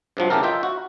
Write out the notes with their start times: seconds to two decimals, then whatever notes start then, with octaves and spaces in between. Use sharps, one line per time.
0.17 G2 C3 F3 F#3
0.30 C#3 E3 A3 G4 A4 A#4
0.43 F4 D#5 E5 G5
0.63 F#4